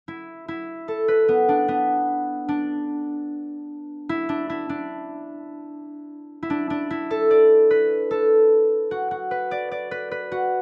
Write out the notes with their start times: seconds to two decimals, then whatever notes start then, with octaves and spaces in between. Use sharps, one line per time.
0.08 E4
0.48 E4
0.88 A4
1.08 B4
1.28 B3
1.49 D4
1.68 B3
2.48 D4
4.09 E4
4.29 D4
4.50 E4
4.69 D4
6.43 E4
6.50 D4
6.70 D4
6.90 E4
7.11 A4
7.31 D5
7.70 B4
8.11 A4
8.91 F#4
9.11 F#4
9.31 B4
9.51 D5
9.71 D5
9.91 B4
10.11 B4
10.32 F#4